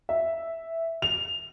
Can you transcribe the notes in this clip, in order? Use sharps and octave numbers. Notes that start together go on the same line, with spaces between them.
E5
F7